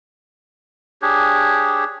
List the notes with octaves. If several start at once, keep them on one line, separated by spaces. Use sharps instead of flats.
D4 G4 G#4 C#5